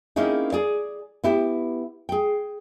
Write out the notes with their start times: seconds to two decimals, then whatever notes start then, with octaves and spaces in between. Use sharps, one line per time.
0.16 A#3 C4 C#4 D#4 E4 G#4
0.52 G#4 D5
1.24 B3 E4 G4
2.09 G#4 G5